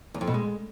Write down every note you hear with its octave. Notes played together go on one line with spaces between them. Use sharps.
E2
F2
B2
G#3